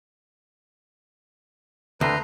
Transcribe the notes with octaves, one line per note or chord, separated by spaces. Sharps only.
D2 B4 A#5 C6